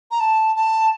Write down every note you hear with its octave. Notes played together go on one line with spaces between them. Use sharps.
A#5
A5
A5